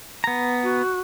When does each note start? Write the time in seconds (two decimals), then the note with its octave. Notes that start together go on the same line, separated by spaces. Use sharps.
0.24 B3 A#5
0.63 F#4